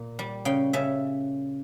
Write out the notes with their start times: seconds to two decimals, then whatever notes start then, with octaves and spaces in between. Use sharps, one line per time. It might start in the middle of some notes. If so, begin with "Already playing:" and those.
Already playing: A#2
0.19 G3
0.45 C#3 G5
0.73 C#3 E5